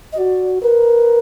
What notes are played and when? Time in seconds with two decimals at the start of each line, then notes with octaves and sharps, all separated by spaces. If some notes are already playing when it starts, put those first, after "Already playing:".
0.12 D#5
0.18 F#4 D5
0.62 A#4 B4